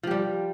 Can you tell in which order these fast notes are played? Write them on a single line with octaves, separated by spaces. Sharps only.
F3 G4 G3